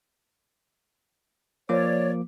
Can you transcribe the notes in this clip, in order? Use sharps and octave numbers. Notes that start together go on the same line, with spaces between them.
F3 A#3 C#5 D5 D6